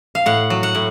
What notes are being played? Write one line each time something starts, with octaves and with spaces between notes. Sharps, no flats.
F5
A2 F#5
F#3
F#5
A2